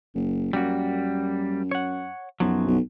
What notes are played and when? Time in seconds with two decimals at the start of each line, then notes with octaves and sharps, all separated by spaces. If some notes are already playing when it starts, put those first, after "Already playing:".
0.15 F#1
0.53 F#2 G3 A#3 F#4
1.71 C#5 F#5
2.40 B1 F#2 F3 F#3
2.67 B1